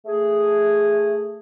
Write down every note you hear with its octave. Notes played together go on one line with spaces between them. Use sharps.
A3 G#4